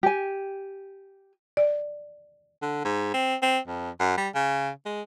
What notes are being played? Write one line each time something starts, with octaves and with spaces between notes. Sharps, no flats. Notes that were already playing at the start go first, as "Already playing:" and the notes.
G4 G#5
D5
D3
G#2
C4
C4
F2
F#2
G3
C#3
G#3